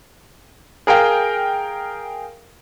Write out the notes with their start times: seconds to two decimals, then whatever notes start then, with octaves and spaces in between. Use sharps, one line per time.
0.87 G#4 A#4 F5 G5